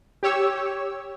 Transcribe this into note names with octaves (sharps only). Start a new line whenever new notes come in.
G4 C#5 E6